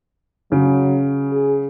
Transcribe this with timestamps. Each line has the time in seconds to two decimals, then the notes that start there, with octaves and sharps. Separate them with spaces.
0.52 C#3 F#3
1.32 G#4